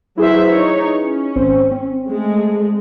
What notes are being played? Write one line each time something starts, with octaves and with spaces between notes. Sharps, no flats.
F#3 E4 G#4 B4 C5 E5
D#4 C#5
C#4
G#1 C4 C5
C4
G#3 A3